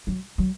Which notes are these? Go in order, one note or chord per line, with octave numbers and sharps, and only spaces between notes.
F#3
F#3